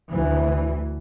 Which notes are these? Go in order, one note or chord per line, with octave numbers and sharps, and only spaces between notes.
D2 E3